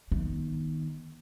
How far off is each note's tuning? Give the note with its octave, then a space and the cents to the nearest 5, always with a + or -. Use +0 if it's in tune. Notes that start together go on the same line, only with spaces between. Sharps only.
D#3 +0 B3 -40